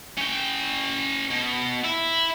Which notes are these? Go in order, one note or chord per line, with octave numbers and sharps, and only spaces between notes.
C#4 G5
B2
E4